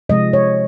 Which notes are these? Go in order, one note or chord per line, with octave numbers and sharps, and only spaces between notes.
C3 F3 G#3 D#5
C#5